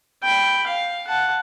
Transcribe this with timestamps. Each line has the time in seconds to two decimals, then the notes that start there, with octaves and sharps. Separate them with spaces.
0.23 G5 B5
0.67 F5
1.07 F#5 A5